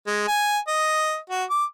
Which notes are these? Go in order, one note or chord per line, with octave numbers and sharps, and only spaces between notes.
G#3
G#5
D#5
F#4
D6